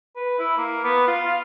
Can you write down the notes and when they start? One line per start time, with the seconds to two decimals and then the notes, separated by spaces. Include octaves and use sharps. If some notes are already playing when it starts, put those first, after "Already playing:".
0.16 B4
0.39 E4
0.57 A#3
0.84 B3
1.08 F4
1.28 F5